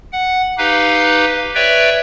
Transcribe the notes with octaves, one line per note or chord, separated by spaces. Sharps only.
F#5
D#4 G4 B4 F5
B4 C#5 D5 E5 G5